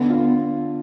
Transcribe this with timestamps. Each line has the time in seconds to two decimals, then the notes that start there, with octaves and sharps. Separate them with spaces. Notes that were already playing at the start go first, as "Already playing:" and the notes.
Already playing: D3 B3
0.10 F4